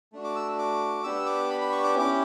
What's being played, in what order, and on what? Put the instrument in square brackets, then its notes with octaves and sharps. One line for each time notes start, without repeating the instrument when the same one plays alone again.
[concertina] A3 D4 F#4
D6
E6
D6
B3 D4 G4 E6
D6
B5
B5
C#6
D6
C#4 E4 G4 D6